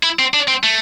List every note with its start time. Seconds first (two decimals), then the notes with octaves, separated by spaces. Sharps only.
0.03 E4
0.19 C4
0.34 D4
0.48 C4
0.64 A3